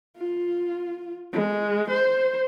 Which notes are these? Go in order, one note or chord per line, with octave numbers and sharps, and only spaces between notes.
F4
G#3
C5